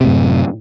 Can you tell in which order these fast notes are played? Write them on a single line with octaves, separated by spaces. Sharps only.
C3 A2 F#2